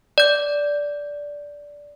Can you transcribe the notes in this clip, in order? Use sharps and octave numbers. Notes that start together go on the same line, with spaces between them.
D5 G6